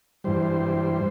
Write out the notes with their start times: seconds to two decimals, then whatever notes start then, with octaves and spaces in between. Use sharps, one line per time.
0.24 G2 E3 G3 C5